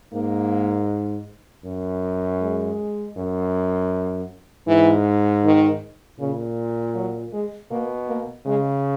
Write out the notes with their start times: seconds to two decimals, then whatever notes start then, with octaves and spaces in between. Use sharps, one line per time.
0.13 G#2 A#3
1.65 F#2
2.41 G#3
3.17 F#2
4.67 G#2 E3
5.44 D#3
6.19 A#2 C#3
6.95 F#3
7.33 G#3
7.71 B2 A#3
8.08 A#3
8.46 C#3 G#3